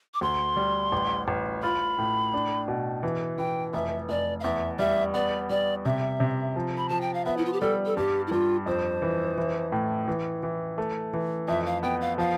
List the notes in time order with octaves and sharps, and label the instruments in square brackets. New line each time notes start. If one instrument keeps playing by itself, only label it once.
[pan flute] D6
[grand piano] D2 [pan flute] C6
[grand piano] G3
A1
A1
[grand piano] F4 [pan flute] B5
[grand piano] A2
D4
B2
E3
[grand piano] E3 [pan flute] G5
[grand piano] F1 [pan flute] E5
[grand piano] F1 [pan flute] D5
[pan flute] F5
[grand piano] E2 [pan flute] E5
[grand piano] G3 [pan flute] E5
[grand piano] B3 [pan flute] D5
[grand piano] G3 [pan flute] D5
[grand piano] C3 [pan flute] E5
[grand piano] C3
F3
[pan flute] B5
[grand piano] F3 [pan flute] A5
[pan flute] G5
F5
[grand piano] B3 [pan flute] E5
[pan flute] E4
F4
G4
[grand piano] G3 [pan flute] A4
[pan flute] A4
[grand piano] G2 [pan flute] G4
[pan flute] E4
[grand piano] G2 [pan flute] F4
[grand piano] F2 [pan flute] C5
[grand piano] E3
E3
A2
E3
E3
A3
E3
[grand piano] F2 [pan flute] E5
[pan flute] F5
[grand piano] B3 [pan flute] G5
[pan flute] F5
[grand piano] F3 [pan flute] F5